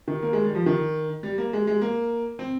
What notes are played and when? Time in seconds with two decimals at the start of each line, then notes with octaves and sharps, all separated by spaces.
0.08 D#3
0.22 A#3
0.33 G#3
0.44 G3
0.55 F3
0.66 D#3
1.23 G3
1.38 A#3
1.53 G#3
1.67 G#3
1.81 A#3
2.39 C4